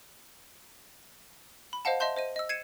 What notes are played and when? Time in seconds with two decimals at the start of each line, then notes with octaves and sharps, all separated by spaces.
1.73 B5
1.85 C5 D#5 F5 F#5 A5
2.00 D#5 E5 A5 C6 G6
2.16 C5 D#5 D#7
2.36 D#5 E6
2.49 G#6 C7 C#7 D#7 E7